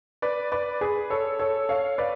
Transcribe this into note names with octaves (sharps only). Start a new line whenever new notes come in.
B4 D5
B4 D5
G#4 B4
A4 C#5
A4 C#5
C#5 F5
B4 D5